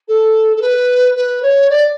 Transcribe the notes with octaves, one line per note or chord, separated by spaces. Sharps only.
A4
A4
B4
B4
C#5
D5